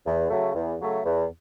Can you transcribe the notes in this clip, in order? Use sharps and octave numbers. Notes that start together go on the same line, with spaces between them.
E2
C#3 F#3 A3
E2
C#3 F#3 A3
E2